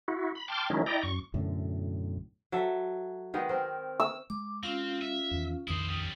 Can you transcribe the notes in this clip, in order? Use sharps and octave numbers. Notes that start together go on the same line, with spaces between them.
E4 F#4
B5
G5 A5 C6 D6 F6
D#3 F#3 G#3 C#4 D#4 E4
E4 D5 D#5 G5 A#5
F#2 C#6
B1 F#2 A2 D3
F#3 A4 E5
D#3 G#3 B3
C4 A#4
E6
G#3 D6
C4 C#4 F4 F5
E5
E2 D#3
A#1 F2 D#3 E4 C5 D#6
G3 C#4